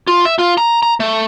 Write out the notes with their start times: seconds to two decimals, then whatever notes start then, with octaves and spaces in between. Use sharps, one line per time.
0.07 F4
0.25 E5
0.39 F4
0.58 A#5
0.83 A#5
1.00 A3